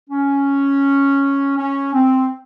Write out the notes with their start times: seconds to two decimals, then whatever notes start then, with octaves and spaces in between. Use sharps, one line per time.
0.10 C#4
1.58 C#4
1.94 C4